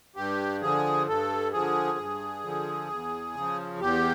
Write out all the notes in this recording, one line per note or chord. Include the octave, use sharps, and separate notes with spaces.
G2 G4
D3 F3 G#4
G2 A4
D3 F3 G#4
G2
D3 F3
E2
C#3 F3
E2 G4